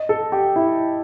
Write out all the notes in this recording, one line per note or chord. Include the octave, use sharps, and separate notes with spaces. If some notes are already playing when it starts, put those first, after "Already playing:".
Already playing: D#5
A4
G4
E4